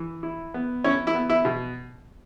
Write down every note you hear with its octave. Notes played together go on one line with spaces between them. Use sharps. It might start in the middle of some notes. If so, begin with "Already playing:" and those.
Already playing: E3
E4
B3
C#4 E4 C#5
E4 E5
B3
E4 E5
B2